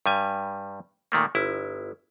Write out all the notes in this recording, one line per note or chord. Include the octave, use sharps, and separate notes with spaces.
G2 G3 G#5
A#2 D#3 A3 A#3
G1 E4